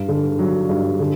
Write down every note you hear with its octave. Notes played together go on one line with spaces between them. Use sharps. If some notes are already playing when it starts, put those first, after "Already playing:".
Already playing: G2
D3
F#3
G2
D3